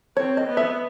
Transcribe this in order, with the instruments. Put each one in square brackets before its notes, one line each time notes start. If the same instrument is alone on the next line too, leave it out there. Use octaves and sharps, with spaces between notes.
[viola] C4 [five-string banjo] C#5
[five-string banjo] D#5
[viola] B3
[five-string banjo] E5